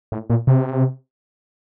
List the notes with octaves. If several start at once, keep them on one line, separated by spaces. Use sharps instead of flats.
A2
A#2
C3